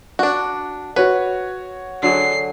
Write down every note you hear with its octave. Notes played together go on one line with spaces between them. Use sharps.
D4 F#4
F#4 B4 C#5
D3 F#3 G#4 C7